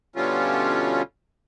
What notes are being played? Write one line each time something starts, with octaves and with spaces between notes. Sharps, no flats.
B2 D3 G3 A3 C#4 F4